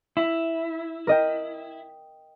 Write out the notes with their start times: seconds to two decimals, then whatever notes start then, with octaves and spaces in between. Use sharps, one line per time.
0.17 E4
1.07 A#4 D#5 G5